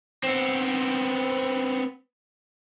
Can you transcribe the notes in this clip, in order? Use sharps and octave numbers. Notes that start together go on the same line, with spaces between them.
B3 C4